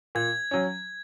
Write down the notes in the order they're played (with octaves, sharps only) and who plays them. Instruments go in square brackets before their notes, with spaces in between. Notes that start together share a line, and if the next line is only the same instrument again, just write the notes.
[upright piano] A#2 [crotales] G#6
[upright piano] F#3 C#4